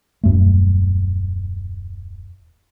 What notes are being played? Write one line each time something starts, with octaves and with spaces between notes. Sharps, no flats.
D#1 F#2 A3